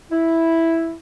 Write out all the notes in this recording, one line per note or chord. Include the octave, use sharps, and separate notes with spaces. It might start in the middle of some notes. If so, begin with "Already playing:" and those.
E4